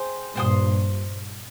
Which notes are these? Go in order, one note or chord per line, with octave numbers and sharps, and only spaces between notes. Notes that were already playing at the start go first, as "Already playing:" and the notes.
Already playing: G#4 C5 G5
G2 A#2 C5 G5 C6 D#6